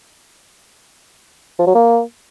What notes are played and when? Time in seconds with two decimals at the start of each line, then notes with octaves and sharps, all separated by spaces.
1.59 F3
1.67 F#3
1.75 A#3